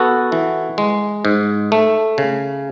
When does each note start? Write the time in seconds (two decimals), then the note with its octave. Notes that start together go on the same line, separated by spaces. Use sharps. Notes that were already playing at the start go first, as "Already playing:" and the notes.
Already playing: B3 F#4 A4
0.32 E3
0.78 G#3
1.25 G#2
1.72 A3
2.18 C#3